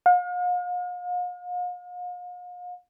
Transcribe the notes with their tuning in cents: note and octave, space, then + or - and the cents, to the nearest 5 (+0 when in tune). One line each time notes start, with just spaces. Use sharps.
F5 +45